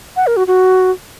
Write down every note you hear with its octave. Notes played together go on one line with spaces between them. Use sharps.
F#5
A#4
F#4
F#4